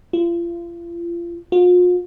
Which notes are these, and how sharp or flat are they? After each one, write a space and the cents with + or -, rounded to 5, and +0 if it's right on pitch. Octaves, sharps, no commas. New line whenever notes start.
F4 -35
F4 +40